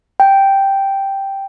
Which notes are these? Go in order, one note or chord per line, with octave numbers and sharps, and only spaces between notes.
G5